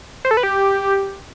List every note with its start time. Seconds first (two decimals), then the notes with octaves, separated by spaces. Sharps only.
0.25 C5
0.31 A4
0.37 B4
0.43 G4